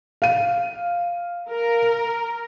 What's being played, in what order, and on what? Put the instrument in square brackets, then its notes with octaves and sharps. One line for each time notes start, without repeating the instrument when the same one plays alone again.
[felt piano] F5 D#7
[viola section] A#4